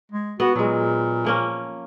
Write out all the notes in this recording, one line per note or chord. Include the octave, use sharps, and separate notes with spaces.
G#3
B3 F#4
A#2 F#3 G#3
F3 A#3 C#4